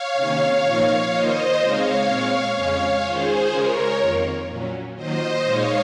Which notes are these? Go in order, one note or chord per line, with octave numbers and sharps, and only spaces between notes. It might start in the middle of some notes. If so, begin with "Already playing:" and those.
Already playing: C#5 F5
C3 D#3 A#3 C#4
A#2 F3 A#3 D#4
D#3 A#3 F4 C5 D#5
C#3 G#3 C4 D#4 C#5 F5
A#2 G#3 C4
F2 C#3 G#3 C#4 C#5 F5
D#3 G#3 C#4 F4 G#4 C5
C#3 G#3 C#4 F4 A#4 C#5
F2 D#3 A#3 F4
A#2 F#3 C#4
D#3 F#3 A#3 F4 C5 D#5
A#2 G#3 D#4 C#5 F5